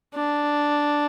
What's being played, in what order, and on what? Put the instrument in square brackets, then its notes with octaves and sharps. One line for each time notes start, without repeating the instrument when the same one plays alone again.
[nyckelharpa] D4